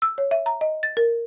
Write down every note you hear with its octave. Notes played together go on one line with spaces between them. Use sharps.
E6
C#5
E5
A#5
D#5
A6
A#4